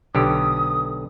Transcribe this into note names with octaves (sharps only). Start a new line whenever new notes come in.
B1 D3 G4 D#6